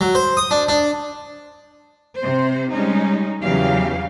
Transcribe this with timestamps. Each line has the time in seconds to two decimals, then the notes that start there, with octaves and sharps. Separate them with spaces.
0.01 F#3
0.15 C5
0.37 D#6
0.51 D4
0.68 D4
2.16 C3 C5
2.71 G3 G#3 C#4 D#4
3.42 E2 C#3 E3 F#3 G4 F5